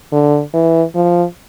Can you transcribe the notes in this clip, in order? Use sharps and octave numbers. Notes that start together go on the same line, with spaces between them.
D3
E3
F3